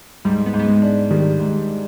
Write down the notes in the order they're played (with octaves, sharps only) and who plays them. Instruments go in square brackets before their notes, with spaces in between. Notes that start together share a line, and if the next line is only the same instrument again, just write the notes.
[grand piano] G#2 [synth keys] G3
[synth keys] B3
[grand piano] G#2
[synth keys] B3
G#3
[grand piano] D4
[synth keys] D#3 [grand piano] G3
[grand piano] G#2